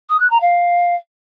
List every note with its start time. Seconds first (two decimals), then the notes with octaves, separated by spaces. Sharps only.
0.09 D#6
0.20 F#6
0.30 A#5
0.41 F5